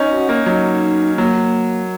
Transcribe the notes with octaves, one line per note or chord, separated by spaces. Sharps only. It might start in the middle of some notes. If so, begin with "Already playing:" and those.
Already playing: C#4 D#4
F#4
A#3 C#4
F#3 D#4
F#3 A#3